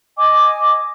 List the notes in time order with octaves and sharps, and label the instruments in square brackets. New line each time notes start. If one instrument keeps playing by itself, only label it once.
[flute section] D#5 G#5 D6